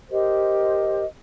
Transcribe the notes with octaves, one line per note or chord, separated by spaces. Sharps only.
G4 A#4 C5 D#5